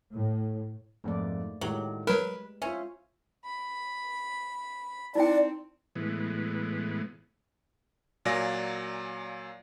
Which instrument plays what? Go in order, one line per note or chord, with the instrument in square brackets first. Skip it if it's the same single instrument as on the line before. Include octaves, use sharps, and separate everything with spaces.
[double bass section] A2
[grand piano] F2 G#2 [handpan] A3 A#3 D5
[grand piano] A2 D#3 [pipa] F#3 [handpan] G#3 G4
[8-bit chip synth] F#3 A#4 [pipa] B4 [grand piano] E7
[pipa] C#4 [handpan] F4 C5 E5
[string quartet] B5
[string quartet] C4 [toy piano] D#4 E4 G5 [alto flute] D5
[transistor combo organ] A2 E3 G#3 B3
[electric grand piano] A#2 F#3 D5 F5 G#5 A#6